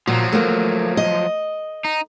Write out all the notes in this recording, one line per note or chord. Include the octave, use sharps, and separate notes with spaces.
A#2 F3 F#3 F#4
A3 A#3
D#5
D#4